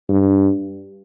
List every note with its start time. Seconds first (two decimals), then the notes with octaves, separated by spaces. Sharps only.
0.09 G2